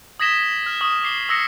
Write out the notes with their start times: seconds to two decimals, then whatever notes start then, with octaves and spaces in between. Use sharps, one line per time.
0.20 D#6 G#6 A#6 B6 E7 G7
0.66 F6
0.81 C#6 D#6
1.03 D6 C7 G7
1.29 D#6 E6 A#6 C7 C#7